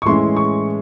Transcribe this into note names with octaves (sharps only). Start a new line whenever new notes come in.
C#6
A2 E3 G#3 C#4 E4 C6
C#6